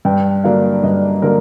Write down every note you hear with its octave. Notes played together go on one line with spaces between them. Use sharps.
G2 G5
D3 F#3 A#3 D4 F5
G2 D#5
D3 F#3 A#3 A#4